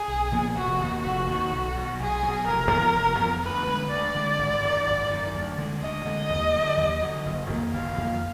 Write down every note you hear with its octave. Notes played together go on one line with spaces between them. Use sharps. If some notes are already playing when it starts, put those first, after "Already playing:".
Already playing: G#4
B1
A#2 F3 B3
F1 F#4
D#2 D#3
F1 F#4
D#2 D#3
B1
B2 F#3
B1 G#4
B2 F#3
F1 A#4
F2 F3 B3
F1
F2 F3 B3
D2 B4
D3 G#3
D2 D5
D3 G#3
G#1
F#2 D#3
G#1
F#2 D#3
D2
D3 G#3
D2 D#5
D3 G#3
D#2
D3 F#3
D#2
D3 F#3
F#1
F2 D#3 A#3
F#1 F5
F2 D#3 A#3